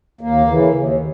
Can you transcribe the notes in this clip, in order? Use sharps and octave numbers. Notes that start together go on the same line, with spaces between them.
D#2 A#3
C#3 E3
D#2